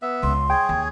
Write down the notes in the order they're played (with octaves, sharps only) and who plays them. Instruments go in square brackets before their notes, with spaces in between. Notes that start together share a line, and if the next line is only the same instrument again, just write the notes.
[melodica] B3 E5
[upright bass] C#2 [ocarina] C6
[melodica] G#4 C#5 [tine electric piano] G5
[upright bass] D#2